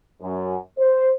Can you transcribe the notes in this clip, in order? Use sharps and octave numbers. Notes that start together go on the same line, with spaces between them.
F#2
C5